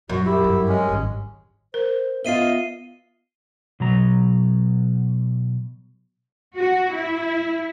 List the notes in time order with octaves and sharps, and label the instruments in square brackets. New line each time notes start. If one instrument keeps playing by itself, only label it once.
[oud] F#2 [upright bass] A#2 [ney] F#4
[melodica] E4 [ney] G4
[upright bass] G2 D3
[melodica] G#3 C#4
[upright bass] G#1 G2
[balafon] A#4 [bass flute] C5
[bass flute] B3 [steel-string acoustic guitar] F4 D#5 E5 [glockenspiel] C7 D#7 G7
[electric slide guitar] B2 F#3 A#5
[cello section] F#4
E4